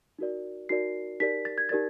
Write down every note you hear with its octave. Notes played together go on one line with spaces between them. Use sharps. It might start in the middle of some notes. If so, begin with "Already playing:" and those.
D#4 F#4 A#4 D5
D#4 F#4 A#4 D5 C7
D#4 G4 A#4 D5 B6
A6
G#6
D#4 G4 A#4 D5 A6